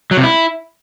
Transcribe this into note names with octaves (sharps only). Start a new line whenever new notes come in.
F#3
C3
E4